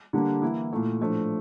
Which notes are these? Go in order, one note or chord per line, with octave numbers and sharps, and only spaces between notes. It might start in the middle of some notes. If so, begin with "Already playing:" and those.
D3 G3 A#3 D4
E3 A#3 E4
A#2 A3 E4
A2 F3 A3 D4